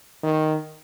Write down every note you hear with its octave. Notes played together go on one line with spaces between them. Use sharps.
D#3